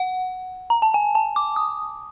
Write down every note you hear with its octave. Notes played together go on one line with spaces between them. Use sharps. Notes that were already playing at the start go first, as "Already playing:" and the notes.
Already playing: F#5
A#5
A5
G#5
A5
D6
D#6